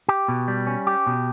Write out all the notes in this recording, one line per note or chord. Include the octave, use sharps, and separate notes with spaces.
G4
B2
G3
C#4
G4
B2